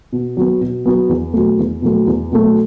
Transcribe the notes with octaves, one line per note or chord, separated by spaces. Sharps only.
B2
F#3 B3
B2
F#3 B3
E2
B2 F#3 A3
E2
B2 F#3 A3
E2
B2 F#3 A3